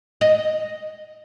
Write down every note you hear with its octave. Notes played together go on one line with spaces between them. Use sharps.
D#5